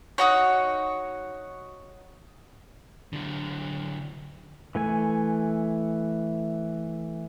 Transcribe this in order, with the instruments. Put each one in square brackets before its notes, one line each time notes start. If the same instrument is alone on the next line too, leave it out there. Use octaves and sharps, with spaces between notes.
[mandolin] D#4 F#4 C#5
[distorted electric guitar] D3 F#3
[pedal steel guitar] E3 A3 G#5